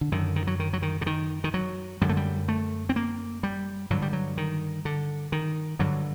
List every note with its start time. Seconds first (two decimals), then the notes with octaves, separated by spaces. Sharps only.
0.01 D3
0.12 F#2 D3 D#3
0.36 D#3
0.47 F#3
0.60 D#3
0.73 F#3
0.82 D#3
1.01 D3
1.06 D#3
1.44 D#3
1.54 F#3
2.01 F#2 D3 G3
2.09 A3
2.17 G3
2.48 A3
2.89 C4
2.96 A#3
3.43 G3
3.90 G2 D3 F#3
4.02 G3
4.13 F#3
4.37 D#3
4.85 D3
5.32 D#3
5.79 G2 D3 F#3